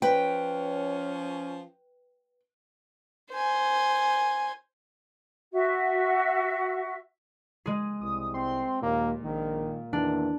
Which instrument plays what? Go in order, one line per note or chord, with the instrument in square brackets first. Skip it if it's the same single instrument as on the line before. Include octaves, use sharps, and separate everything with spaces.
[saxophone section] F3 C#4 [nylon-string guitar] B4 G5
[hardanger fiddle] C5 G#5
[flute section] F#4 E5
[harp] G#3 G#4
[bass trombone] C2 [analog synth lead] D#6
[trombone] C4 [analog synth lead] C6
[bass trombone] D#2 [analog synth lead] A#2 [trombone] A#3
[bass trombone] A#1 [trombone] D#3
[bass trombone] E2 [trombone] D#3 [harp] D4